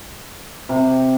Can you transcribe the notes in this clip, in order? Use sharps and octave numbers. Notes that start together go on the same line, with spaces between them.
C3